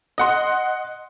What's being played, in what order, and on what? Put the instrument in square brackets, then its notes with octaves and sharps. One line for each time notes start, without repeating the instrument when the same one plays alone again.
[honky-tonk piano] D#5 F#5 C6